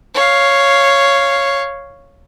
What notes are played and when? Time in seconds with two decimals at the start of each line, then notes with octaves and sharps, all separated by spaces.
0.14 C#5 F5